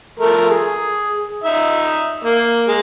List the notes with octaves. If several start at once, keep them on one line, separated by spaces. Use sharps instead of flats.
F3 A3 A#4
G#4
D#4 E5
A#3
G#3